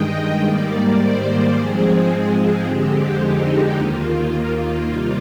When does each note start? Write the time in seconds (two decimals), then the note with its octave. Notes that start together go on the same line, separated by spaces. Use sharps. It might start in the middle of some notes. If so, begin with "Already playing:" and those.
Already playing: G2 D#3 G#3 D#5 G5
0.43 G#2 D#3 G3 A#3 D5
0.99 C5
1.54 G#2 F3 G#3 C4 G#4
2.10 G#4
2.65 F2 D3 G#3 C4 G4
3.20 D#4
3.75 D#2 D#3 A#3 F4
4.86 C3 G3 A#3